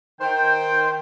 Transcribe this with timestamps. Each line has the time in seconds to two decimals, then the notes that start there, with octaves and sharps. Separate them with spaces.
0.20 D#3 C5 G5